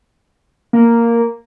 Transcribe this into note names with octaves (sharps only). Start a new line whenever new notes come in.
A#3